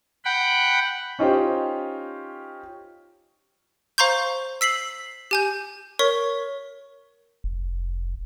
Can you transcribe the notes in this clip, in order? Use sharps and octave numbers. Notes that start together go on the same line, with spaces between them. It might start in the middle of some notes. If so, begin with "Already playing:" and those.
F#5 G5 B5
C#4 D#4 F4 G4 C5
C5 F5 A#5 C6 C#6 G6
E6 B6 C7 F#7
G4 G#5 G6
A#4 C#5 C#6 B6
F1